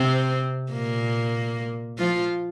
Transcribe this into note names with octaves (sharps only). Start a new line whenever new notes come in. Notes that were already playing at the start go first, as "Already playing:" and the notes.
Already playing: C3 C4
A#2 A#3
F3 F4